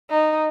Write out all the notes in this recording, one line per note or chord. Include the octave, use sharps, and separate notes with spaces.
D#4